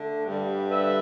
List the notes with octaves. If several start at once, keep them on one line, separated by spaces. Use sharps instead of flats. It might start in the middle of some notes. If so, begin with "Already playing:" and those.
Already playing: D3 A3
G2 D3 G3
B4 E5